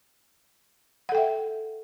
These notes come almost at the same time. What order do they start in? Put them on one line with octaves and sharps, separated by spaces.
F#5 A4 G5 E5